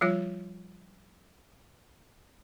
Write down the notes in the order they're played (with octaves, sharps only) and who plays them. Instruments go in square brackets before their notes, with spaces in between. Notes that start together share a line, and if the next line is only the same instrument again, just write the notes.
[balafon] F3 G3 F4 C#5